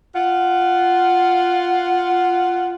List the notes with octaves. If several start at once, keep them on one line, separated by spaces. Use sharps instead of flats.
F4 F#5